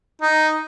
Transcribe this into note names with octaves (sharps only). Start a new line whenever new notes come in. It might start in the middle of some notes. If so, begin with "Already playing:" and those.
D#4